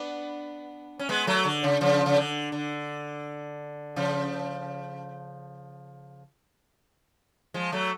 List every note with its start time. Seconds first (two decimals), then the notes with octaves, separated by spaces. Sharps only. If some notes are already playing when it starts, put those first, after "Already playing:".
Already playing: B3 D4
0.99 C#4
1.09 G#3 B3
1.27 F#3 A3
1.45 D3
1.64 C#3
1.81 C#3 F3
2.06 C#3
2.16 D3
2.52 D3
3.96 C#3 F3
7.54 F3 G#3
7.72 F#3 A3